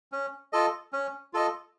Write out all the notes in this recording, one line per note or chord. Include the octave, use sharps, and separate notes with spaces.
C#4
F4 A4 D#5
C#4
F4 A4 D#5